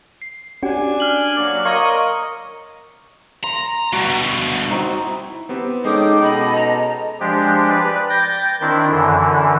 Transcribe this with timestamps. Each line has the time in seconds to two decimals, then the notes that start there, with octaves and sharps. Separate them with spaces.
0.22 C7
0.63 C#4 D4 F#4 G4 G#5
1.00 F6 F#7
1.36 F#3 A#3 D5
1.65 A#4 C#5 D#5 F5 C6 C#6 G#6
3.44 A#5 C6
3.93 G2 B2 F#4
4.70 C4 D#4 F#4
5.04 E4
5.49 B3 C4 G4
5.85 G#3 C#4 D#4 A4 G5 D6 D#6
6.21 B2 A4 D#5 B5
6.56 A#5
7.20 F3 G#3 D4 G4
7.70 B4 D5
8.10 G5 G6 A6 A#6
8.60 D#3 C4 D4 E4
8.90 F#2 D3 E3